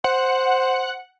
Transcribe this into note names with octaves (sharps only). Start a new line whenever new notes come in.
C5 F#5